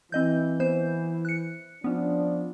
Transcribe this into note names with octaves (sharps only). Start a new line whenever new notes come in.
E3 C4 D#5 G6
B3 C5 G6
F#6 C#7
F3 B3 C#4 D4